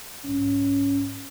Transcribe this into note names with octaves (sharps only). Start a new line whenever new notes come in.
B1 G#2 C#4